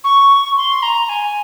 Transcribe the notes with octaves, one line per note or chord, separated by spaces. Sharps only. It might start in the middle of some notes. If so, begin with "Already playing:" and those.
C#6
C6
A#5
G#5